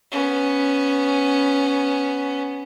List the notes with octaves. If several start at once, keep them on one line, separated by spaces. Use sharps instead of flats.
B3 C#4